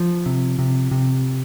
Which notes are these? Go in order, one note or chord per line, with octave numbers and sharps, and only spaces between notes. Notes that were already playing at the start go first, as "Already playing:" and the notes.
Already playing: F3
C3
C3
C3